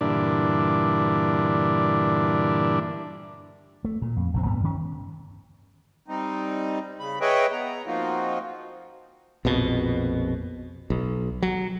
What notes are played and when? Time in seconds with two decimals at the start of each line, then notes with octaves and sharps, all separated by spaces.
0.01 G2 A#2 D3 E3 D4
3.85 A3
4.02 A#2
4.16 F2
4.34 A#1 C3 C4
4.46 D2 G2 B3
4.63 D#3 C#4
6.08 G3 C4 D#4
7.00 C#3 B5
7.21 G#4 B4 C#5 D#5 E5 G5
7.52 B3 A#5
7.86 F3 A#3 C4 D#4 F4 F#4
9.45 A#1 F2 B2
10.90 B1
11.42 F#3